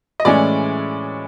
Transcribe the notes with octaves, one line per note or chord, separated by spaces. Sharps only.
D#5
A2 E3 G#3 C#4 D5